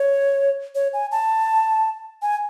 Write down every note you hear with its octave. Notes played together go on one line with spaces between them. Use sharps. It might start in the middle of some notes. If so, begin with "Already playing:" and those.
Already playing: C#5
C#5
G#5
A5
G#5